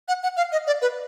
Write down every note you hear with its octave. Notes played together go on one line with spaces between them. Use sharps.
F#5
F#5
F5
D#5
D5
B4